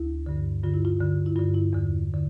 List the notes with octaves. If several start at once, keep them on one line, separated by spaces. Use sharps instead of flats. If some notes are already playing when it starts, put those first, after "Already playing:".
Already playing: D2 E4
G2 D3
G2 D3 F4
E4
F4
G2 D3
E4
G2 D3 F4
E4
E2 D3
D3